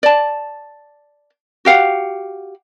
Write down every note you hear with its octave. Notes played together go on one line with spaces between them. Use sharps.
D5 A5
F#4 G4 F5 F#5